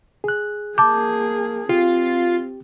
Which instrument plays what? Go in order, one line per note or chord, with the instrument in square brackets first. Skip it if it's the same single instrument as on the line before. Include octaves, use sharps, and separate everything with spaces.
[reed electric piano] G#4 F#6
[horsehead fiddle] A#3 G#4 [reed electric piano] A5 G6 [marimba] D6
[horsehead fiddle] C4 [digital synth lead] F4 [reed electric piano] G4